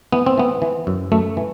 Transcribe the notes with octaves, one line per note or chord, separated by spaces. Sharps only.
E3 B3
C4
E3 B3
E3
F#2
F#2 A3
E3